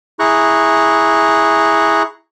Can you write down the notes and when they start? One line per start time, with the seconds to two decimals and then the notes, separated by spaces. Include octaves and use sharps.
0.19 E4 G#4 A#5 C#6 F#6